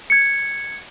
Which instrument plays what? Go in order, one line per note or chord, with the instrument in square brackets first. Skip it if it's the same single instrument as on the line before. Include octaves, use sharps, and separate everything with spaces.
[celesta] G#6 C#7